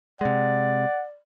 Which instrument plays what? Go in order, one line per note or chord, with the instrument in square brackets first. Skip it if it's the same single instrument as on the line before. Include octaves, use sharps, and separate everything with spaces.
[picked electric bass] C3 G#3 [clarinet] D5 [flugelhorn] F#5